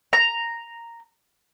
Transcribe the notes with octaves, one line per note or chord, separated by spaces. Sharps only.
A#5